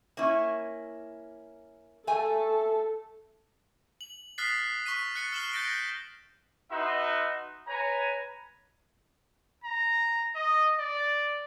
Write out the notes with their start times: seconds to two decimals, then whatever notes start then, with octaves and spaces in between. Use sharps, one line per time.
0.17 A#3 C#4 E4
2.07 A3 A4 G#5
4.01 F#7
4.38 D#6 F6 F#6 A6 B6 C7
4.86 C#6 F6 B6 D#7
5.15 F#6 A6 C#7
5.32 F6 C7 E7 F#7 G7
5.52 G6 A6 A#6 D7 G7
6.71 D#4 F#4 B4 E5 C6
7.67 B4 C#5 G#5 A#5
9.64 A#5
10.36 D#5
10.79 D5